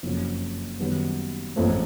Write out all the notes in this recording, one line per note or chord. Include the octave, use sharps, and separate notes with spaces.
F#1 F2 C#3 F#3
F#2 D#3 G3 B3
A1 G#2 F3 A3 C4